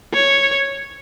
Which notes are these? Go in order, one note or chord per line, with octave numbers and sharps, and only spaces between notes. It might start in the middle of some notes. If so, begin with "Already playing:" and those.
C#5